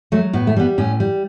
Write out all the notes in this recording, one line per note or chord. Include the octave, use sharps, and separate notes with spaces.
F#3 A3
A2 B3
A3
G3 B3
A2 C#4
G3